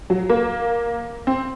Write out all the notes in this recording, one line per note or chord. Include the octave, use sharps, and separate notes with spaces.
F#3
A#3
C4